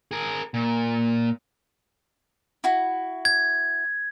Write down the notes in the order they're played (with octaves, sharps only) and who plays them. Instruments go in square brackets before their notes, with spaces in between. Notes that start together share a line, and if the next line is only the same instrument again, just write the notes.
[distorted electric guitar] G#4 A#4
A#2
[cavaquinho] E4 F#4
[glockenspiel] G#6